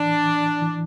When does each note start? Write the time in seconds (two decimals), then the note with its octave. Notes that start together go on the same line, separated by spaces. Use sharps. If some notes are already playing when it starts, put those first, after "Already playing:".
Already playing: A2 E3 D4
0.26 E3
0.62 E3